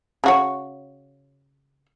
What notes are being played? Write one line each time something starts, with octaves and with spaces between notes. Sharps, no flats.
C#3 F#4 C#5